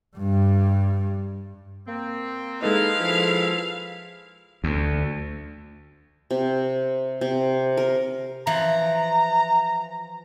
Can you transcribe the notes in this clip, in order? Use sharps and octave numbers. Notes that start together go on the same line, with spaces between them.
G2 G3
A#3 C4
G#3 D#4 E4 A4 B4 F5
F3 E4
D2
C3
C3
A#4
E3 F3 A#5